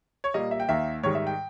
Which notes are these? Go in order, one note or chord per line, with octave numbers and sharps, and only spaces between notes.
C#5
A#2 G3 A#3 D#5
E5
G5
D#2 D#3 A#3 E5
G#2 D#3 G3 C#5
E5
G5